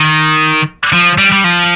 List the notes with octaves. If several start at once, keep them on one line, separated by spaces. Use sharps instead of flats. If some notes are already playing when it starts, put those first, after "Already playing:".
Already playing: D#3
F3
G3
G3
F3